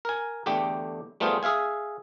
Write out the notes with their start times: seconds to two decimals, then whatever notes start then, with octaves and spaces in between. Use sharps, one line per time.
0.05 A#4 G#5
0.46 E2 D3 A3 G4 G5
1.20 G3 A3 B3 F4 G#4 C5
1.43 G#4 E5 F5 G#5